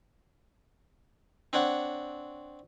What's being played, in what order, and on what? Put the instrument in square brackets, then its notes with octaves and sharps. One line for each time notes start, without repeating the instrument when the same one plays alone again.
[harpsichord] C4 D4 C#5 F#5